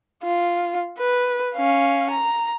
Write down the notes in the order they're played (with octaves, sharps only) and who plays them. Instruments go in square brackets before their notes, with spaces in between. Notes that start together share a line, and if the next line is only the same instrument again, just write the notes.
[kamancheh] F4
B4
C#4 F5
A#5